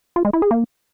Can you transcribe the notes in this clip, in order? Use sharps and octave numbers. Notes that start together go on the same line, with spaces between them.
F4
G#3
E4
G#4
A#3